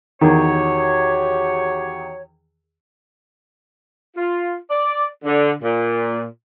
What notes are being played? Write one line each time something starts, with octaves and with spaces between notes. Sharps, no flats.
E2 D#3 F#4 G4 C#5
F4
D5
D3
A#2